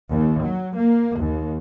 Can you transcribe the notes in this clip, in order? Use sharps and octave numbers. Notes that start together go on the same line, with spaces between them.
D#2
F#3
A#3
D#2